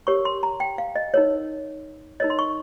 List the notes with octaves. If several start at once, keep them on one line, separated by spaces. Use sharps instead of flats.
G4 A#4 C#5 C#6
C6
A#5
G5
F5
D#5
D#4 A#4 C#5
D#4 A#4 C#5 D#5
C6
C#6